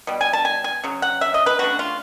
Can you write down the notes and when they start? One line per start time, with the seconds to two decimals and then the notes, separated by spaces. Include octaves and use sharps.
0.07 B2 G3
0.21 G#5
0.33 A5
0.45 G#5
0.64 G#5
0.84 C#3 F#3
1.02 F#5
1.21 E5
1.34 D#5
1.46 B4
1.59 C#3 F#3 A3 D4 F#4
1.79 F4